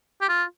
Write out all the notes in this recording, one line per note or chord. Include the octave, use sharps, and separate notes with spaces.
G4
F4